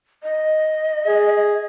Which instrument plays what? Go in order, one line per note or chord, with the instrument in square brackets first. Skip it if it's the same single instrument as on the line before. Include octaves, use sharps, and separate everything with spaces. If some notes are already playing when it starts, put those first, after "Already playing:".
[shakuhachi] D#5
[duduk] G#4